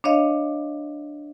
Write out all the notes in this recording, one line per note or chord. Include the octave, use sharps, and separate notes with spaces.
D4 C#5 D#5 F5